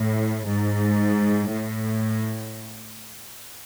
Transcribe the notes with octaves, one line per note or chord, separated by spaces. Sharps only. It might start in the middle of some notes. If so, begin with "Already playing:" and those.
Already playing: A2
G#2
A2